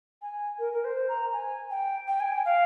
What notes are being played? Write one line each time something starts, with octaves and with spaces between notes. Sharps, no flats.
G#5
A#4
A#4
C5
A#5
G#5
G5
G5
G#5
G5
F5